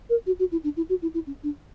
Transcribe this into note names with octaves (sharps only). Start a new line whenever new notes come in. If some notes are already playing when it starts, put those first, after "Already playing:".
A#4
F#4
F#4
E4
D4
E4
F#4
E4
E4
C#4
D4